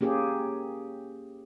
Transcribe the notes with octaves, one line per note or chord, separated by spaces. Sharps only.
A#3 C#4 G4 G#4